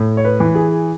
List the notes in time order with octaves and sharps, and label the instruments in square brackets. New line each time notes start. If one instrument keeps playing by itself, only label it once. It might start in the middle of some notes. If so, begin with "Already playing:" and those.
Already playing: [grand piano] A2
C#5
B4
E3
G#4